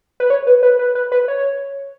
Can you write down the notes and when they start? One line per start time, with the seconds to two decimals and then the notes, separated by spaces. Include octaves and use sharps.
0.20 B4
0.30 C#5
0.47 B4
0.63 B4
0.79 B4
0.95 B4
1.12 B4
1.28 C#5